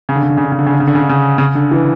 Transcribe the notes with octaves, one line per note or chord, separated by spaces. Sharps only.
C#3
D3
C#3
D3
C#3
D3
C#3
D3
C#3
D3
C#3
D3
C#3
D3
C#3
C#3
D3
E3